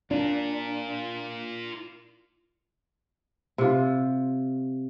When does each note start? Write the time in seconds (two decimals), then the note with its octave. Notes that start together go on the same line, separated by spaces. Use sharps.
0.11 D4 F4 A#4
3.58 C3 F4